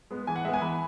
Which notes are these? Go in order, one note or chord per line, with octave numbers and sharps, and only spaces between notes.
G#3 B3
E3 G#5
F#5
G#3 B3 E5 G#5
E3 B5